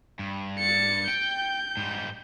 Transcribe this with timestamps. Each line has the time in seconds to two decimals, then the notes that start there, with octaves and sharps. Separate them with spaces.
0.19 G2
0.59 A6 C#7
1.08 G5 G6
1.77 G#2 G3